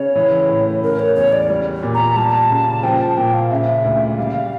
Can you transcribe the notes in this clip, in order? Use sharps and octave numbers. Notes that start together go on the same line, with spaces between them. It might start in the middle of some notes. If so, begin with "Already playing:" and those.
Already playing: C#3 C#5
E3
A2
C#3 A#4
C#5
E2 C#5
D5
G3
A#2
A#5
G3 A5
C#3
F3 G5
A5
A#2 G5
F5
C#3 E5
D2
G3 F5